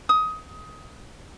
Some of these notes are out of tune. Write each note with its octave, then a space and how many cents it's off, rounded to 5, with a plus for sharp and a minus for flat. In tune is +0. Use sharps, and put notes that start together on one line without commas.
D#6 +20